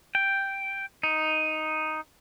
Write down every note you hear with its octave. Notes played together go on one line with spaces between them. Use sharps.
G5
D#4